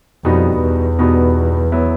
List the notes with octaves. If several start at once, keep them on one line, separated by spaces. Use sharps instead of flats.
F2 B2 G3 B3 D#4 F#4
E2
B2 G3 B3 D#4 F#4
F#3 B3 E4